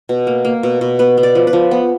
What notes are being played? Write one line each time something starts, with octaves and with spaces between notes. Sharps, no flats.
B2
A#3
A#3
B2
B2
B3 B4
B3
D5
F3
B4
F3
B3